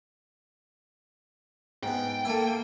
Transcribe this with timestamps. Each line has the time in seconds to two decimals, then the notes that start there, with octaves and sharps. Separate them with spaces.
1.83 G#2 B3 G5
2.25 A#3 E4 A4